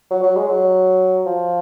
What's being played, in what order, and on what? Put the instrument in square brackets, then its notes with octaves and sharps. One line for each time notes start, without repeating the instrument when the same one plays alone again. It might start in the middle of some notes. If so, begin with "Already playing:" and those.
[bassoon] F#3
F#3
G#3
F#3
F3